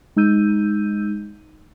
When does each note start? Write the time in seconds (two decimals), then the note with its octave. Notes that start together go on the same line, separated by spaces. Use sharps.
0.16 G#3 D#4 E6 G6 D#7